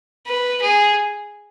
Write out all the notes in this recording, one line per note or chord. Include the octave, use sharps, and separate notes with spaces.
B4
G#4